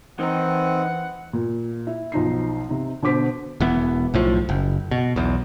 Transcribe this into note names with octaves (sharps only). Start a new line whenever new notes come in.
D#3 E3 C4 D#4 F#5
A#2
E4
B1 F3 D#4 C7
C3 D#4
B2 D3 C5 D6 B6
E1 E3 B3
B1 A2 F3
F#1
B2
B1 E2